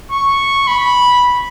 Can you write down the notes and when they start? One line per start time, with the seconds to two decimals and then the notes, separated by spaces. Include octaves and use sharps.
0.11 C#6
0.67 B5